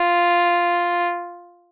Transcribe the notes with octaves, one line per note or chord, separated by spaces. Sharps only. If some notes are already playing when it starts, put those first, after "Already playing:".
Already playing: F4